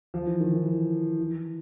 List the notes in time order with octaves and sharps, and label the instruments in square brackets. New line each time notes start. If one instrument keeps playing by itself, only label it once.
[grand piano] F3
E3
D#3
E3
E3
E3